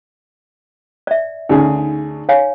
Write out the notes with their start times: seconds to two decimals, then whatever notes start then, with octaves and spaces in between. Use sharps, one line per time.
1.07 D5 E5
1.49 D2 C#3 D#4 G#4
2.29 C#5 F5 G#5